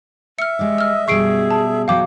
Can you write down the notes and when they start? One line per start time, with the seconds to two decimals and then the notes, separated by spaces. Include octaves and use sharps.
0.39 E5 F6 C#7
0.59 G#3 G4 D5 D#5
0.78 E6 F6
1.08 F#2 B2 G3 G#4 C#6 C7 D7
1.51 A5
1.88 B2 F#3 F5 G5 D6